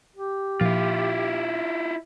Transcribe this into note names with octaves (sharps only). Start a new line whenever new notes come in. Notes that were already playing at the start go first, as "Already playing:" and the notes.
G4
A#2 F3 E4 F4